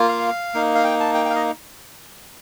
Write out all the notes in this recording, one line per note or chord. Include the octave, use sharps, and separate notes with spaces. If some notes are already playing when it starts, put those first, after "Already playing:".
Already playing: A#3 F4
F5
A#3 D#4
F5
G5
A5
G5
G5
F5
D#5